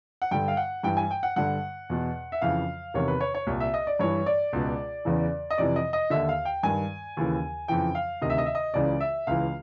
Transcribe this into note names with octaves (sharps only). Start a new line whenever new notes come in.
F#5
G2 D3 G5
F5
F#5
G2 E3 G5
G#5
G5
F#5
G2 D3 F#5
E2 B2
E5
F2 C#3 E3 F5
E2 C3 D#3 C#5
B4
C#5
C#5
C2 A#2
E5
D#5
D5
G2 E3 C#5
D5
C#2 B2
E2 C#3 E3
D#5
F2 C3 E3 D5
D#5
D#5
D#2 D3 E5
F5
G5
G2 D#3 G#5
D#2 C#3 E3
F2 C#3 E3 G5
F5
D2 C3 D#3 D#5
E5
D#5
E5
D#5
C#2 C#3 E3 D5
E5
C#2 C#3 E3 F5